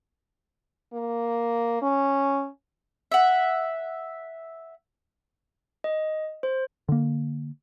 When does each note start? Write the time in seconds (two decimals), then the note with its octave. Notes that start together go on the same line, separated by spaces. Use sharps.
0.94 A#3
1.82 C#4
3.12 E5 F#5
5.84 D#5
6.43 C5
6.89 D3 A#3